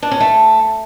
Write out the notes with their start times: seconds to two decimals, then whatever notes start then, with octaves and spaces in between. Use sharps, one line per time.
0.03 D4
0.11 C#4
0.20 A3